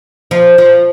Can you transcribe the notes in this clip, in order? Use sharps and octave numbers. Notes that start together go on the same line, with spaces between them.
F3
F3